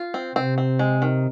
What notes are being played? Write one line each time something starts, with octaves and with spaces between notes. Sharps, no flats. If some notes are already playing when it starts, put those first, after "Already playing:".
Already playing: F4
C4
C3 C4
C4
G#3
D#3